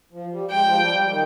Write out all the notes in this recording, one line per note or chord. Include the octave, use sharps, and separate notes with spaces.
F3
G3
G#3 G5
F3
G3
G3
D#3